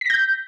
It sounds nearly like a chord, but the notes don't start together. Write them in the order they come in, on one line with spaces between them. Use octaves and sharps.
B6 A#6 G6